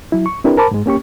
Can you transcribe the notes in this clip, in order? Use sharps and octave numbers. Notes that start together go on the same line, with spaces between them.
F#3 E4
C#6
C4 D4 E4 G4 A#4 B4
A#4 C5 A5 B5 D6
G#2 G#3
A#3 C#4 G4 C#6